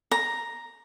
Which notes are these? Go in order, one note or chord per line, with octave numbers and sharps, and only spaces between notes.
A#5